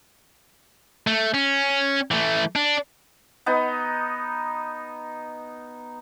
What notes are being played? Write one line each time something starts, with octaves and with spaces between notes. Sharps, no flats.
A3
C#4
E3 A3
D4
B3 D#4